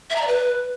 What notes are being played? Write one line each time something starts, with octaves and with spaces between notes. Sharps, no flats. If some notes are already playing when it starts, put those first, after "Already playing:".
E5
A#5
D5
B4